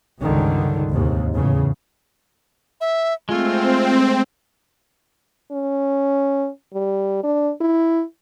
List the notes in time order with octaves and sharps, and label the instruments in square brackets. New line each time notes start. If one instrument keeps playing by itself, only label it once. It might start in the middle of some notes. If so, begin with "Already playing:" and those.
[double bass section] C#2 G2 D3 D#3
D#2 G#2 C3
E2 A2 C#3
[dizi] E5
[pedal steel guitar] G#3 A3 [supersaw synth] C4 [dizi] F4
[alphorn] C#4
G3
D4
E4